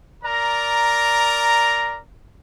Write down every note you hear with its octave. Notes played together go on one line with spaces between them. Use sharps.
A#4 D5 A#5